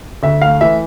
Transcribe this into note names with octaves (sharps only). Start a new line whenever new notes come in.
D2 E5
A3 F5
E3 E5